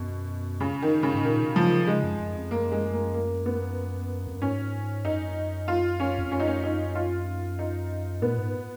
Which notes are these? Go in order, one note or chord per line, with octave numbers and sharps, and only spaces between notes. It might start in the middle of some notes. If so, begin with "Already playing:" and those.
Already playing: F#2 B2
C#3
D#3
C#3
G#2
A#2 D#3
B2
C#3 F3
C#3
C#3 G#3
F#2
F#2
F2
F#2 A#3
G#3
A#3
A#3
B3
F2
F#2
G#2 C#4
F#2 D#4
F4
C#4
F2
F#2 C#4
D#4
C#4
D#4
F4
D#4
A#2 B3
G#2